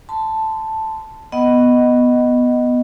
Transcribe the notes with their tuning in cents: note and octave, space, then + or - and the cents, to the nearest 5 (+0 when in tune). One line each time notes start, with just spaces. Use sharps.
A5 +0 C6 -30
B3 +0 D#5 -5 F#5 +20